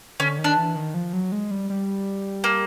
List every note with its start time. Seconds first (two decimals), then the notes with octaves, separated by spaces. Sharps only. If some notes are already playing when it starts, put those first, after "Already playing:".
0.20 D3 C#4
0.39 D#3
0.44 D4
0.57 E3
0.75 D#3
0.94 F3
1.13 F#3
1.32 G#3
1.51 G3
1.70 G3
2.44 A#3